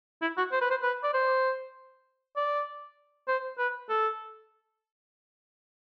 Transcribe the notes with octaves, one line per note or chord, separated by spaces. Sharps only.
E4
F#4
C5
B4
C5
B4
D5
C5
D5
C5
B4
A4